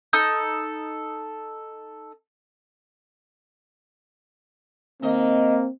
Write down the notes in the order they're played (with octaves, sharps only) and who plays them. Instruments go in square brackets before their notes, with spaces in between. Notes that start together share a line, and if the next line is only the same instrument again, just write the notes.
[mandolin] D#4 A4 D#6 G6
[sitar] D#3 D#5 [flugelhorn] A#3 [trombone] C4